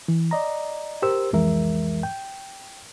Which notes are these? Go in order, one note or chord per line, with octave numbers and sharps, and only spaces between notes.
E3
D5 D#5 A#5
G4 A#4 C5 E6
C2 F2 E3 G#3 A#4 E5
G5